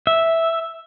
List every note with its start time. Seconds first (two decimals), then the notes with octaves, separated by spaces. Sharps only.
0.07 E5